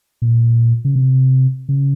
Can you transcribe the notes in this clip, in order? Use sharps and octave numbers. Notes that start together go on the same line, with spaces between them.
A#2
C#3
C3
C#3